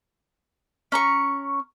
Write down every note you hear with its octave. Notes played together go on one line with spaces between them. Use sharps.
C#4 A#5 C#6